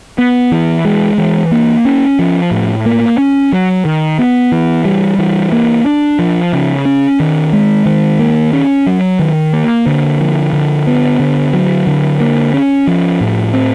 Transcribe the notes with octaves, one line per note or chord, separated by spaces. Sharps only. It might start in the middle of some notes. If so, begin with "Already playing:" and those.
B3
E3
G#3
E3
A#3
C#4
F3
A2
A#3
C#4
F#3
D#3
B3
E3
G3
E3
A#3
D4
F3
C#3
C#4
D#3
G#3
D#3
A#3
C#4
F#3
D#3
A#3
D3
F3
D3
B3
D3
F#3
D3
A#3
C#4
F3
A2
C4